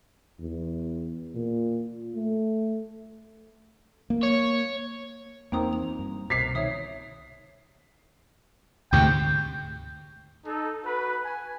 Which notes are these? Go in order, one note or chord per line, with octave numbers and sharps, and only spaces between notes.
E2
A#2
A3
A#3
C#5
E2 A#3 C4 D#4 G5 A#5 D#6
F7
G2
C2 B2 C5 B6 C7 F7
D#3 C#5 E5 D#6
D2 G#2 C3 G5
D#4 A4
F#4 B4
G#5